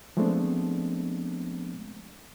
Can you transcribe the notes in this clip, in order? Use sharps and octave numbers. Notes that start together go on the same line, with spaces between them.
F3 G#3 A3 B3 C4 D4